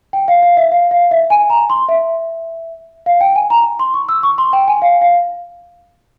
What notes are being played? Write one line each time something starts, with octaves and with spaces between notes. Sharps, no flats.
G5
F5
F5
E5
F5
F5
E5
G#5
A#5
C6
E5
F5
G5
G#5
A#5
C6
C#6
E6
C#6
C6
G5
G#5
F5
F5